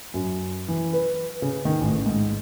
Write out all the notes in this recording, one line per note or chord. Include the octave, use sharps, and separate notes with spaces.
F#2
E3
B4
C#3
D#3
A1
G#2